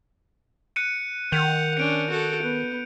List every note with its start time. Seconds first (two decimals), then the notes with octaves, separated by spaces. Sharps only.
0.76 F#6 C#7 D#7
1.32 D#3 F#5 G6 F7
1.77 C#4 D4 C#7 D7
2.10 F#4 A4
2.42 B3